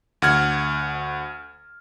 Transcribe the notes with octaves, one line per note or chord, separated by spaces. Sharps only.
D2 F#5 F6 G#6